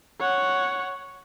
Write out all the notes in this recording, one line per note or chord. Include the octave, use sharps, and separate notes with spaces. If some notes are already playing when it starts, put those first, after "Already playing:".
C#5 F#5